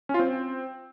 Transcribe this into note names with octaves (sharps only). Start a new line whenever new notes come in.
C#4
F4
C4